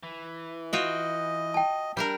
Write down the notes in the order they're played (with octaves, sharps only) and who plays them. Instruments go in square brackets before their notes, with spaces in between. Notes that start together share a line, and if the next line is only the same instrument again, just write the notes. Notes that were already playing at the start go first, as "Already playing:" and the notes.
[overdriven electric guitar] E3
[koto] F4 F#4 G5 [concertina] D#5
[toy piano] G5 A5
[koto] G3 D4 A#4 [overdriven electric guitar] G5